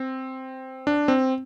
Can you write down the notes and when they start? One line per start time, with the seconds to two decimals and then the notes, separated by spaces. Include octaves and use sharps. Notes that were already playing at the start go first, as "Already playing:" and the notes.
Already playing: C4
0.87 D4
1.08 C4